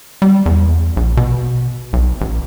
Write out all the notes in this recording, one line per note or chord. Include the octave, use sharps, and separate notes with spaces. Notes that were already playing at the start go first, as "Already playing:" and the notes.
G3
E2
A#1
B2
B1
A1